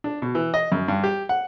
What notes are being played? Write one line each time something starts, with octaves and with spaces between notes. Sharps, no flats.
D4
B2
E3
D#5
F#2
G2
G4
F#5